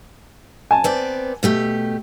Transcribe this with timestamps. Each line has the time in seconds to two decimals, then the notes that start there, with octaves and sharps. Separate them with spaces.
0.71 G#5 A5
0.84 B3 C4 D5
1.43 B2 A3 G4